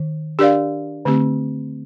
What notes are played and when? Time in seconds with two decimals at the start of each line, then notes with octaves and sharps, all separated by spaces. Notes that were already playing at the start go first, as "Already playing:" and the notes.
Already playing: D#3
0.39 D4 G4 A#4 D5 F5
1.05 D3 A3 C4 G4